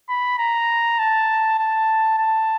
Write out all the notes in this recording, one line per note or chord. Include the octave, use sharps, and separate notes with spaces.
B5
A#5
A5
A5
A5